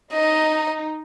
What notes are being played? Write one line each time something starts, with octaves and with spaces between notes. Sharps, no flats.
D#4 D#5